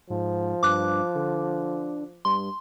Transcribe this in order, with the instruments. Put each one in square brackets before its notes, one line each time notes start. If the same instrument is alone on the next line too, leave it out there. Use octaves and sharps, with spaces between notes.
[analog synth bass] G#2 [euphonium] F3
[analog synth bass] G2 [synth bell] D6 F#6
[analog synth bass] D3
[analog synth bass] G2 [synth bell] C6